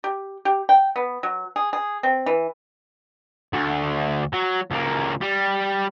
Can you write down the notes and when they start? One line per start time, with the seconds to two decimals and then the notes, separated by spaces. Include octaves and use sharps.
0.04 G4
0.45 G4
0.69 G5
0.96 B3
1.23 F#3
1.56 G#4
1.73 G#4
2.03 C4
2.26 E3
3.53 D2 D3
4.33 F#3
4.71 C#2 A#3
5.21 G3